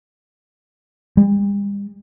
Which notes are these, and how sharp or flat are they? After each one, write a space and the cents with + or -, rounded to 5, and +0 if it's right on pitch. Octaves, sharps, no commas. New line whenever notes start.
G3 +45